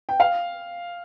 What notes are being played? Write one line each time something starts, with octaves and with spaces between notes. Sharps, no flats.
G5
F5